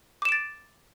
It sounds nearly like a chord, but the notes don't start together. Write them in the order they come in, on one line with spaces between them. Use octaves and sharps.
D6 E7 D7 A6